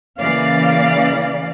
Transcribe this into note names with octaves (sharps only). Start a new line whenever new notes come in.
C#3 E3 A#3 D5 F5